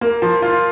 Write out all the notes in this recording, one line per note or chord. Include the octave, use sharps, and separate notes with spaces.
A#3
F3
F4